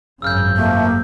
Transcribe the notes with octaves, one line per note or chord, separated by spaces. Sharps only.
G#1 F#2 C#3 E6 F6 G6
C3 F3 A3 A#3